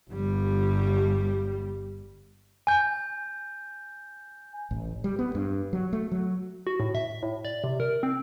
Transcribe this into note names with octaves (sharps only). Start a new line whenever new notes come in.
G1 G3
G#5 G6
A1
G3
B3
G2
F#3
A3
F#3
F#4
A2
E5
A2
D5
C3
A#4
C4